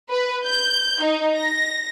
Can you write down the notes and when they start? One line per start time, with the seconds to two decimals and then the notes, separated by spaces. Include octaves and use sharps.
0.10 B4
0.45 G6
1.01 D#4
1.36 A#6